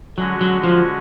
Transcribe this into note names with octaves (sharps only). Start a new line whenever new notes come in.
D3 F#3 G#3 C#4 F#4
F#3
F3